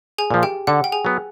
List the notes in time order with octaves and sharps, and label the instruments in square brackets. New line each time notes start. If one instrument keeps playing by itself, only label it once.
[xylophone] G#4 G#5
[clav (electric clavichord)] A#2 F3
[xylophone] G4 G5
[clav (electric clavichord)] D3 [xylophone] F#5
[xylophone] G5
G#4 G#5
[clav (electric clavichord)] F#3 B3